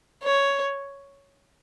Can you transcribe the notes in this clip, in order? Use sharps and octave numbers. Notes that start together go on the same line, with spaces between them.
C#5